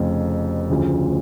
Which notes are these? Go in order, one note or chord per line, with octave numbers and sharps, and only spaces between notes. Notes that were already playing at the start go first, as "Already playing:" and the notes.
Already playing: F1 F2 C#3
D2 C#3 F3